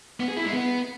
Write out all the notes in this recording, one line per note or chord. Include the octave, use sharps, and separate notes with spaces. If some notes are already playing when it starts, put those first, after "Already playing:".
B3
G#4
E4
G#3
B3